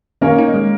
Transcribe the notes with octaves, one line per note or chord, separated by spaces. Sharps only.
D#3 A#3 C#4
D#4
G#3